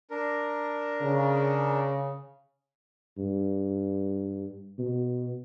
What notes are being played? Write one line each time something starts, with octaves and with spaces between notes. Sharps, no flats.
D4 A#4
C#3
G2
B2